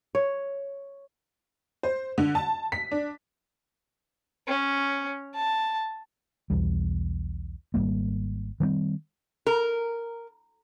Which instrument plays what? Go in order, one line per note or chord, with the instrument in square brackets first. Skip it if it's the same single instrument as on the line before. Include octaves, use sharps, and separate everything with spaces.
[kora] C#5
[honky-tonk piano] C5
D3
A5
B6
D4
[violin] C#4
A5
[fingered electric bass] B1 E2 G3
G#1 F2 G3 A#3
D#3 G3 A3 C4
[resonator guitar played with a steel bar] A#4